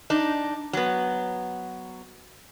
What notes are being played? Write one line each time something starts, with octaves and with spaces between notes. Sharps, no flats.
D4 D#4
F#3 B3